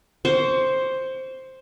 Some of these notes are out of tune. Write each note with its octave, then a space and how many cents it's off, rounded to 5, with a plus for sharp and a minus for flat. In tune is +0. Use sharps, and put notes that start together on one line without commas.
C5 +5 C#6 +30